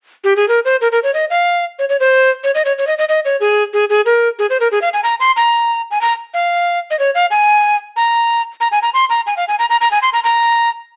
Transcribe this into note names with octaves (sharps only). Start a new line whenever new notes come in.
G4
G#4
A#4
C5
A#4
A#4
C#5
D#5
F5
C#5
C#5
C5
C#5
D#5
C#5
C#5
D#5
D#5
D#5
C#5
G#4
G#4
G#4
A#4
G#4
C5
A#4
G#4
F5
G#5
A#5
C6
A#5
G#5
A#5
F5
D#5
C#5
F5
G#5
A#5
A#5
G#5
A#5
C6
A#5
G#5
F5
G#5
A#5
A#5
A#5
G#5
C6
A#5
A#5